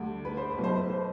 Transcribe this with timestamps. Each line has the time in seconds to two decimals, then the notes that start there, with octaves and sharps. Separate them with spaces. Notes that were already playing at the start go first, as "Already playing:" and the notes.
Already playing: D2 D3 G3
0.25 B4
0.37 C5
0.51 B4
0.58 B1 B2 A3
0.64 C5
0.78 B4
0.89 C5